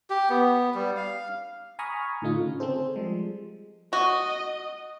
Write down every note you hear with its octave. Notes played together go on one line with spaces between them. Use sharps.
G4
B3
G3
F5
G#5 A#5 B5 C#6 D#6 F6
A2 D3 A3 D#4 F4
C#3
C4 G#4 A4 C5
F3 G3 G#3
F#4 D#5